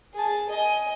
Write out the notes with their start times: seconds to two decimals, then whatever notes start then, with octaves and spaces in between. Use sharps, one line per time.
0.14 G#4 A5
0.49 D#5 G#5